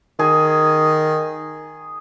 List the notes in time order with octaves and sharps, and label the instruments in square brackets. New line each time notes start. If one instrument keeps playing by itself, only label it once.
[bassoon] D#3 [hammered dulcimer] G#4